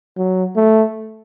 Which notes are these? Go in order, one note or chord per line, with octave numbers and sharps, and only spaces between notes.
F#3
A3